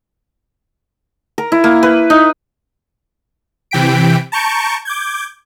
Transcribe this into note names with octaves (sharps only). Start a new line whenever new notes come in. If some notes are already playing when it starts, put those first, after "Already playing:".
A#4
E4
A#3
B4
D#4
C3 E3 G5 B6 D7
A5 A#5 C#6 G6 C#7 D7
D6 G6 G#6